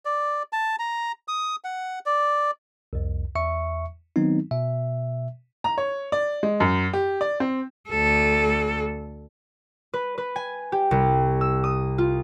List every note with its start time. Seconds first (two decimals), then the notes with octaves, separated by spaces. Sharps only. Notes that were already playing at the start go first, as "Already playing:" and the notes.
0.05 D5
0.53 A5
0.79 A#5
1.28 D#6
1.64 F#5
2.06 D5
2.93 C2 F2
3.35 E2 E5 C#6 C#7
4.16 D#3 F#3 B3 C4 D#4
4.51 B2 E5
5.64 A#5
5.78 C#5
6.12 D5
6.43 G#3
6.60 F#2
6.93 G4
7.21 D5
7.40 C4
7.89 D2 A4
9.94 B4
10.18 B4
10.36 G#5
10.72 G4
10.91 C2
11.41 E6
11.64 D#6
11.98 F4